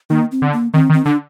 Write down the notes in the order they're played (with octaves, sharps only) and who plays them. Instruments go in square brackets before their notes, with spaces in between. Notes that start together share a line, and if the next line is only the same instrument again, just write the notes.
[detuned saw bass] D#3 [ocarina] A#3
[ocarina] C4
[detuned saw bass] D3
[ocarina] A#3
[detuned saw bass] D#3 [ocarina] C4
[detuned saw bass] D#3
[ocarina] C4
[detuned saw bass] D3 [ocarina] D4